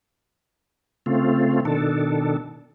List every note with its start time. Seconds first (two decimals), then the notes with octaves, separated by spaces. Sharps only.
1.06 C#3 A3 C4 F4
1.65 B2 D#3 D4 A4